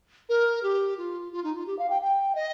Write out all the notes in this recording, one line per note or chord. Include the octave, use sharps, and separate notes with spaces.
A#4
G4
F4
F4
D#4
F4
G4
F5
G5
G5
D#5